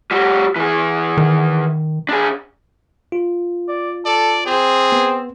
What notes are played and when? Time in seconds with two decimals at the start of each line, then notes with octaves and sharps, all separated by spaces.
0.11 G3 F#4
0.56 E3 G#4
1.17 D#3
2.09 D4 G#4
3.12 F4
3.68 D5
4.06 A4 D5
4.46 C4 G#4
4.92 B3